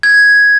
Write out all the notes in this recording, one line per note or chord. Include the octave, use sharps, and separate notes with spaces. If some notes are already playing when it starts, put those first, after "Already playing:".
G#6